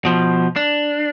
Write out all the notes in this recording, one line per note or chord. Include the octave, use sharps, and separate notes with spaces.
B2 F3
D4